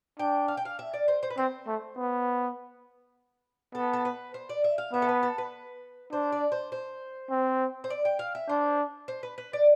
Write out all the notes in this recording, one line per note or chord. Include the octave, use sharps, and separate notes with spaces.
D4 G5
F5
G5
F5
E5
D5
C5
C5
B4
C4 C5
A3
B3
B3 A4
A4
B4
C5
D5
E5
F5
B3 E5
A4
B4
A4
B4
D4 C5
D5
C5
C5
C4
C5
D5
G5
F5
E5
D4 C5
C5
B4
B4
D5